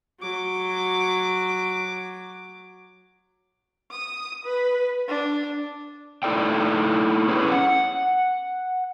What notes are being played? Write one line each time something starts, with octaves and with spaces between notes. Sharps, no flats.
F#3 D6
D#6
B4
D4
A3 D#4 E4 A4 D5 G5
B3 C#4 E4 G#4 B4 C#5
F#5